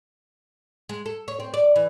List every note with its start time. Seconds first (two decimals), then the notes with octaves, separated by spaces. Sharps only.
0.89 G#3
1.06 A4
1.28 C#5
1.40 C4
1.54 D5
1.76 E3